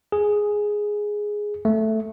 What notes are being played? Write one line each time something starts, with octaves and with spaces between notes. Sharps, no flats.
G#4
A3